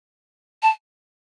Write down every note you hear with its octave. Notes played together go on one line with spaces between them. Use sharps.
A5